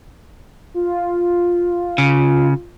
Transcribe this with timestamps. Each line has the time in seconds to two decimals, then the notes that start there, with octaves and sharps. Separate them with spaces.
0.74 F4
1.98 C#3